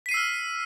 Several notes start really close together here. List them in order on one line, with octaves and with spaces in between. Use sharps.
B6 D#7 C7 E6 F6